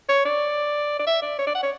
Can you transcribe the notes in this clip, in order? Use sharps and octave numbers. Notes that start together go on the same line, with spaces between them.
C#5
D5
D5
E5
D5
C#5
D5
F#5
C#5